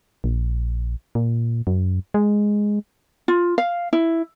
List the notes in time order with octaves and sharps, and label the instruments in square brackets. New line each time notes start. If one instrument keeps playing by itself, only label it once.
[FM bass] A#1
A#2
F#2
G#3
[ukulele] F4
F5
E4